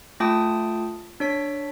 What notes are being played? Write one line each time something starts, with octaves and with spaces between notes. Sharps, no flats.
A3 F4 G5 A5 D#6
D4 C#5 B6